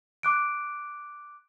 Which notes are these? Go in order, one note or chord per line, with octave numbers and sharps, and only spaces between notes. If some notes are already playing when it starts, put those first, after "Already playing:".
D6 F#6 D7